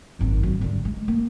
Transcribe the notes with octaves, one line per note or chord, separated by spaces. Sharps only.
G#1 F#2
F#3
G2 D3
G#3
A#3